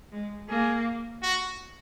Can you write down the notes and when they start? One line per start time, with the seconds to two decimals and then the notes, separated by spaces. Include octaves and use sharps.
0.12 G#3
0.49 A#3 G#4
1.23 F#4